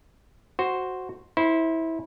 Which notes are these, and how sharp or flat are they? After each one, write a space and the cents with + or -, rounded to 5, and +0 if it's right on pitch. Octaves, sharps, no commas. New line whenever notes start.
F#4 +0 C5 +0
E4 -20 C5 +0